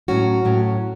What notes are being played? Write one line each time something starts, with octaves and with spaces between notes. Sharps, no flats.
A2 F#3 C#4 F#4
A2 F#3 C#4